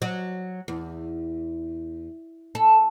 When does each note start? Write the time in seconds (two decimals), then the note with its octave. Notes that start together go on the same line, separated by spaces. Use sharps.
0.02 F#3
0.68 E2
2.55 A4